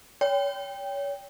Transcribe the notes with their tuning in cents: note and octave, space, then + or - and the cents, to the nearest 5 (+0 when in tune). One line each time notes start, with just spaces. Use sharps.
C#5 +30 G5 +15